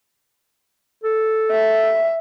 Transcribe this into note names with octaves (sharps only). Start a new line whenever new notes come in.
A4
E5